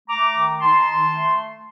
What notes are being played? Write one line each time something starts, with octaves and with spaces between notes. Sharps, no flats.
A3 A#5 D6
D#3
D#4 A5 C6
D#3
A3